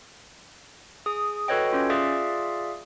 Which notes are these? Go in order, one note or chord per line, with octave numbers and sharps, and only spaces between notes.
G#4 D#6
F#4 A4 B4 C#5 D#5 G5
C#4 F4
F4 G#4 D5 E5 F5